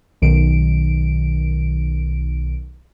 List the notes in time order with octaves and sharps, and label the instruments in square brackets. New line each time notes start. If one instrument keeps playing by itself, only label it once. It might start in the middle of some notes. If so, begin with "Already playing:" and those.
[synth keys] B1 D#3 D7